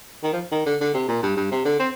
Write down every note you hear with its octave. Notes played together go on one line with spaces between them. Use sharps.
D#3
F3
D#3
D3
D3
C3
A#2
G2
G2
C3
D3
C4